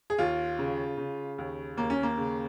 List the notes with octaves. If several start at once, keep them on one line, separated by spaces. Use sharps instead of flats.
G#4
D#2 F4
C#3
C#3
D#2
D#2 A#3
C#4
A#3
C#3